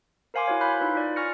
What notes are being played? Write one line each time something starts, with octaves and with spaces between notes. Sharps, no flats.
A#4 C5 F5 G#5 C6 D6
E4 F#4 C#5
C#5 F5 B5 F#6 G6
D#4 F4 B4
F4 D5
G#5 C#6 F6 A#6 C#7